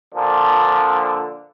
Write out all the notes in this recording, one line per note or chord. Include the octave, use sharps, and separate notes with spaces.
A#2 D3 F3 D4